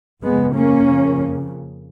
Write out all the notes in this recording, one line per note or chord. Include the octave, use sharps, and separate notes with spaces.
F2 C#3 G#3 B3
A#3 C#4
F2 C#3